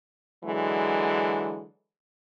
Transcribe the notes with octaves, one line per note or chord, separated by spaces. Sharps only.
D3 E3 F#3 G#3